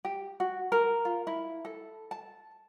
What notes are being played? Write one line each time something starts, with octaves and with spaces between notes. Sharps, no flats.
G4
F#4
A#4
F4
E4
A4
A5